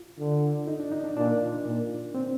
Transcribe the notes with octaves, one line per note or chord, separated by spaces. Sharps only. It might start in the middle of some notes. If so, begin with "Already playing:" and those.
Already playing: F4
D3
D#4
D4
D#4
D4
A#2 D4
A#2
C4